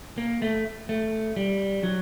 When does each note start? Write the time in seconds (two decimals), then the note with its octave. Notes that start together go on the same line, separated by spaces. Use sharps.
0.18 A#3
0.42 A3
0.89 A3
1.36 G3
1.83 F#3